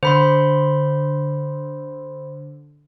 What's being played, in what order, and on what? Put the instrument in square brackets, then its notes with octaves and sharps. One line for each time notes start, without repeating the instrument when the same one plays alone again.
[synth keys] D3 [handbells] C5 B5 C6